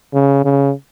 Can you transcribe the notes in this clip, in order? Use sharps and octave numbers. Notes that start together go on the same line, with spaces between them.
C#3
C#3